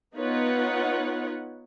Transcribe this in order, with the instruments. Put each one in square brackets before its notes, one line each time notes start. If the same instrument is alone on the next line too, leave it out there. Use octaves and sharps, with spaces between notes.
[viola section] B3 D#4 F4 B4 C#5 F#5